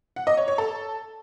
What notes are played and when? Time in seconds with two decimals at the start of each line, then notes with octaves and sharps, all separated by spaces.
0.16 F#5
0.27 D#5
0.37 C#5
0.48 C#5
0.58 A4